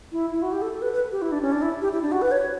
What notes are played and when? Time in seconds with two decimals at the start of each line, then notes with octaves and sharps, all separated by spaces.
0.12 E4
0.33 E4
0.42 F#4
0.52 G4
0.62 A4
0.72 A4
0.82 B4
0.93 B4
1.12 G4
1.22 E4
1.32 D4
1.42 C#4
1.52 D4
1.62 E4
1.82 G4
1.92 E4
2.02 D4
2.12 F#4
2.22 B4
2.32 C#5